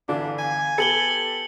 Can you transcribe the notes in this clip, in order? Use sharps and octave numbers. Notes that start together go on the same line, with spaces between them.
G1 D3 E3 D4
G#5
B3 G4 A4 C#7 F#7 G7